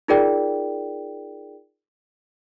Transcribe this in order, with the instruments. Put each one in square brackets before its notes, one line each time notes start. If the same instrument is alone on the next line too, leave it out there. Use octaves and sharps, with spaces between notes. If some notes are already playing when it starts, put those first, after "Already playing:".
[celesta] D#4 F4 G#4 A#4 D5 G5